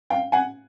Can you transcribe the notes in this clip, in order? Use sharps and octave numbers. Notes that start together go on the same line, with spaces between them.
F5 G5
F#5 G#5